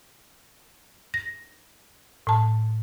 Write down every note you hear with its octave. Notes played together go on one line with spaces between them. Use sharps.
A#6
A2 A5